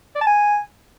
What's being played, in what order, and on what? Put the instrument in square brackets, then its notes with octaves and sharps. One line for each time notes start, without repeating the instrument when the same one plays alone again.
[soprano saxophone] D5
A5
G#5